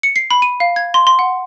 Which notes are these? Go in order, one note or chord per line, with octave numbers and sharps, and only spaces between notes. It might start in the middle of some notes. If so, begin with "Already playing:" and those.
C#7
C7
B5
D#7
F5
G#6
C6
C6
F#5